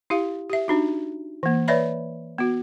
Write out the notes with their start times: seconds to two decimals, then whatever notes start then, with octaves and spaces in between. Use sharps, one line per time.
0.10 E4 G4 F5
0.49 G4 E5
0.68 D4 D#4 F#4
1.43 E3 A#3
1.68 B4 C#5 D5 E5 B5
2.38 B3 F#4